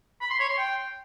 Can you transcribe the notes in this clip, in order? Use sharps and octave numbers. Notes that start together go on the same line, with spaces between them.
B5
C6
C#5
C6
G5